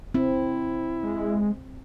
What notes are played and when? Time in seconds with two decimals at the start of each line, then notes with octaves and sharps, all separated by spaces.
0.14 C4 E4
1.03 G#3